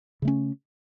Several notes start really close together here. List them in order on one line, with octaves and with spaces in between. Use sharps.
C#3 A3 C#4